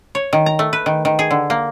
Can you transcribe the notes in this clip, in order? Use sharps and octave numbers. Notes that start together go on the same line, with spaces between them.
C#5
D#3
A#5
A3
B4
D#3
D#3
G#4
D3
A#3